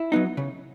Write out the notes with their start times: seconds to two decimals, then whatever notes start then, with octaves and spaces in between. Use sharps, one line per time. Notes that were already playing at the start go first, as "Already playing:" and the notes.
Already playing: E4
0.12 F#3 B3 D#4
0.37 C#3